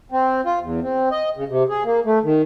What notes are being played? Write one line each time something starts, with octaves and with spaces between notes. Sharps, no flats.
C4
F4
E2
C4
D#5
C#3
C3
G#4
A#3
A3
D#3